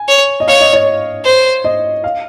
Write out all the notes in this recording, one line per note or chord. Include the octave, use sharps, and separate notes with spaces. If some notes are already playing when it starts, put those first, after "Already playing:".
Already playing: G#5
C#5
D#5
C#5 F5
D#5
C#5
C5
D#5
F5